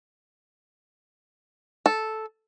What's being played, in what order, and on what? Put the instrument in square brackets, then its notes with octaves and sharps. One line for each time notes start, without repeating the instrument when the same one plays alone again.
[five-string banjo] A4